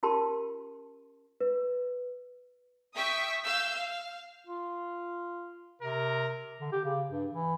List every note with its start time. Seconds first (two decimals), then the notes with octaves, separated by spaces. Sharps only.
0.03 C#4 F4 G4 A#4 A5 C6
1.41 B4
2.96 E5 G5 C#6 D#6 B6
3.43 F5 E6 G6
3.74 F5
4.47 F4
5.82 C3 A#4
6.60 D3
6.72 G4
6.84 C#3
7.11 G2
7.32 E3